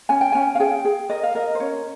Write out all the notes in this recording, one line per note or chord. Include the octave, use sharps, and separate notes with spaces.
C#4 G#5
G5
C#4 G#5
F5
G#4 G5
G#4
A#4 D#5
F5
A#4 D#5
C5
C#4 C#5